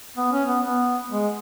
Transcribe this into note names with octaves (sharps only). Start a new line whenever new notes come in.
B3
C#4
B3
B3
G#3